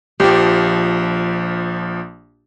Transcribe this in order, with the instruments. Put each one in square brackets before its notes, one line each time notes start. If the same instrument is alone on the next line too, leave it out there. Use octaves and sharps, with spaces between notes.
[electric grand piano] A#1 F3 [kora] G4